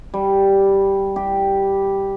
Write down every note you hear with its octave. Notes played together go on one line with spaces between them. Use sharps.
G3
G4